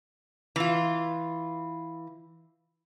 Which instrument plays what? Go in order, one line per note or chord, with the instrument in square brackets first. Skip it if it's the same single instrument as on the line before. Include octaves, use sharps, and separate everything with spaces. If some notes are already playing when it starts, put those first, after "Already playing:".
[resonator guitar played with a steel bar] E3 F4